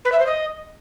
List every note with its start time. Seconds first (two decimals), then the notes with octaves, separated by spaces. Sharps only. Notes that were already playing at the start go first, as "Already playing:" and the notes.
0.05 B4
0.12 E5
0.19 C5
0.27 D#5